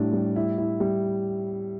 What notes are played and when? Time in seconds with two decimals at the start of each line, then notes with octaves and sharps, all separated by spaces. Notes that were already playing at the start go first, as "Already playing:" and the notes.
Already playing: A2 G3 D4
0.13 G3
0.36 E4
0.58 E4
0.80 G3